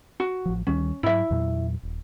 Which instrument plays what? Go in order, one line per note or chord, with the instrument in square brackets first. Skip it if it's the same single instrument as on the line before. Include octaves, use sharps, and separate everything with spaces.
[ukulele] F#4
[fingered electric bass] A1 F3
[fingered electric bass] D2 D#3 G3 [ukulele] C#4
[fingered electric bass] G#2 F#3 [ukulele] E4 E5
[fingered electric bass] E2 A#2 F#3
D#1